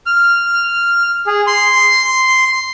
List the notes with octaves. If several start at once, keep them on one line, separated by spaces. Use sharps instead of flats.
F6
G#4
C6